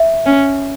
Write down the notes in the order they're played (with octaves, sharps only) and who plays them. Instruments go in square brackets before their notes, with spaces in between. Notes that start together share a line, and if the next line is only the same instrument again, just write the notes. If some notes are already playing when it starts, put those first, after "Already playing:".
Already playing: [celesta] E5
[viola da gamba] C#4